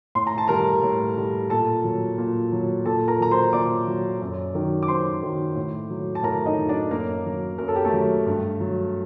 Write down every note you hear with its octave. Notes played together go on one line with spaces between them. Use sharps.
A2 C6
A#5
A5
G3 A#4 A#5
A2
G3
A#2 A4 A5
F#3
A#2
F#3
A#2 A4 A5
A#4 A#5
F#3 A#5
C5 C6
A#2 D5 D6
F#3
F#2
D#3 F#3
D6
F#2 C5 C6
D#3 F#3
A2
F#3
A5
A2 A#4 A#5
D#4 D#5
F#3
D4 D5
F#2 A#3 A#4
F#3
F#2 A#4
A4
G4
A3 A4
F#3
G2
F#3